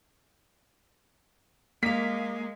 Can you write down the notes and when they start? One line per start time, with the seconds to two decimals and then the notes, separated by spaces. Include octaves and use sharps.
1.83 G#3 A#3 A#4 F5 B6